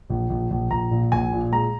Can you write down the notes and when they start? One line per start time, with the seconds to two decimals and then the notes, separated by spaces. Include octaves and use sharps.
0.10 A#1
0.30 A#1
0.50 A#1
0.70 A#1 A#5
0.91 A#2
1.12 A#1 G#5
1.32 A#2
1.52 G#3 A#5